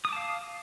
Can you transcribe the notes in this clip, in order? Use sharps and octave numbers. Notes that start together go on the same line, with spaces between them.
F5 A5 D6 D#6